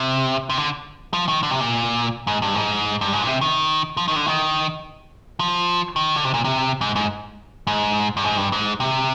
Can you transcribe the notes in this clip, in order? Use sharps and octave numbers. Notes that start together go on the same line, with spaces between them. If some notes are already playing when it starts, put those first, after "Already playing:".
Already playing: C3
C3
D3
F3
D#3
D3
C3
A#2
G#2
G2
G#2
G2
G#2
A#2
C3
D#3
F3
D#3
D3
D#3
F3
D#3
D3
C3
A#2
C3
G#2
G#2
G#2
G2
G#2
G2
G#2
C3